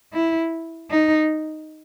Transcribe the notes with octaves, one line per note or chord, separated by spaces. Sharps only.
E4
D#4